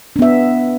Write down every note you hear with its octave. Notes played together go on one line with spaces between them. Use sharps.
B3 D4 E5